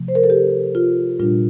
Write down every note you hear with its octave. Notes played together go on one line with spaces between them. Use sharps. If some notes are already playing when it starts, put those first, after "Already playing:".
Already playing: C3 F3 A3
C5
A#4
A4
G4
F4
A#2 G3 D4 F4